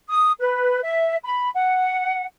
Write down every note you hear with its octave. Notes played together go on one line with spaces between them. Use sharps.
D#6
B4
E5
B5
F#5